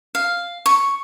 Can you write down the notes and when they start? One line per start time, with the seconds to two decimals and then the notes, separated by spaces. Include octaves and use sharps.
0.15 F5
0.66 C#6